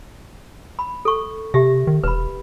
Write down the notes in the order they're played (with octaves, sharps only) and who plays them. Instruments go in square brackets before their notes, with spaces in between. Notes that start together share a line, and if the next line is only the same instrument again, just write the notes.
[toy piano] B5
A4 C#6
[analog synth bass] C3 [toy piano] G4 E5
[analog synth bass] D#3
[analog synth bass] E1 [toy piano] B4 B5